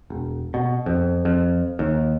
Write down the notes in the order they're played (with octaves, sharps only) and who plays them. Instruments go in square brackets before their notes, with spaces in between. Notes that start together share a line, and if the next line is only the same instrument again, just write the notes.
[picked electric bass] E1
B2
F2
F2
D#2